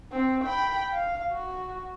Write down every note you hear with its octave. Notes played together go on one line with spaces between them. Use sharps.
C4
G5 B5
F5
F#4